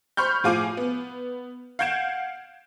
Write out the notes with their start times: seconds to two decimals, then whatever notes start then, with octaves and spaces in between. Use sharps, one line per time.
0.17 C5 B5 C#6 F6 G6
0.44 A2 F3 G#4 F5 D6 D#7
0.77 B3
1.79 F5 F#5 G6 G#6 D7 E7